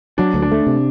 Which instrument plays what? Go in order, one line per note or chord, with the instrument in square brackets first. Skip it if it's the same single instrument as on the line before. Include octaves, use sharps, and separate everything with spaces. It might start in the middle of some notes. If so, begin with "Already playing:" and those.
[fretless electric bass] F#3 [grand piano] D4
[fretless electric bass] D2
[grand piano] D4
[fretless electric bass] A3
C3